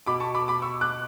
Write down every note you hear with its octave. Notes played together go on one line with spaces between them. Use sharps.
B2 B5 D6
A5 C#6
B5 D6
B5 D6
C#6 E6
D6 F#6